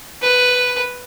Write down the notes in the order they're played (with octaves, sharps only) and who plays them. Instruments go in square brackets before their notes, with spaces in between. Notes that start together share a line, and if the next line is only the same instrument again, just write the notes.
[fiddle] B4